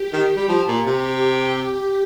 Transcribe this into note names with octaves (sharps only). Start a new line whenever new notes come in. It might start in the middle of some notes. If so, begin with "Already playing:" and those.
Already playing: G4
D#3 G4
G3
F3
A#2
C3 G4